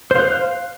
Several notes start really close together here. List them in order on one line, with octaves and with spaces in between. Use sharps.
C5 F5 F#6